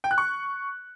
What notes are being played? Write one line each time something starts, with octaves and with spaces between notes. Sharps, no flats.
G5
F#6
C#6